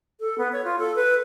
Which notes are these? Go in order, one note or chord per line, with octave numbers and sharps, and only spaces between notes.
A4
B3
C#5
F4
A4
B4